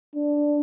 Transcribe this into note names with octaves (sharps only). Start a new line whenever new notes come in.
D4